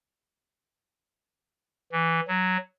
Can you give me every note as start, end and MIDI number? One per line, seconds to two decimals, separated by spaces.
1.92 2.20 52
2.28 2.57 54